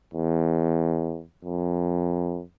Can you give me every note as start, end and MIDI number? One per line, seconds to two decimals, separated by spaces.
0.14 1.22 40
1.45 2.41 41